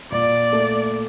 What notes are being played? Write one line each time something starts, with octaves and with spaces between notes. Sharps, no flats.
A#2 D5
A3